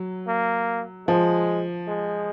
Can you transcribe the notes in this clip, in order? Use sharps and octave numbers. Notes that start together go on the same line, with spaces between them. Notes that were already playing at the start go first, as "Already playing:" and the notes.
Already playing: F#3
A#3
F3 G#3
G#3